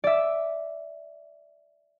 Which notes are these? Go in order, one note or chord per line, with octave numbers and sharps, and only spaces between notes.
D5 E5